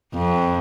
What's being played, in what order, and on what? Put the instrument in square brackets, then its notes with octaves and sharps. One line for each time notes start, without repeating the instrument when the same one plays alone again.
[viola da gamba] F2